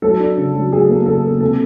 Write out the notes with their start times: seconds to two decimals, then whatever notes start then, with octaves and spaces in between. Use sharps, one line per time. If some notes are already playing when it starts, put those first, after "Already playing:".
0.02 F#3 A4
0.20 D4
0.37 C#3
0.54 F#3
0.72 F#3 G#4
0.88 A#3
1.06 C#3 A4
1.24 A#3
1.41 C3 A4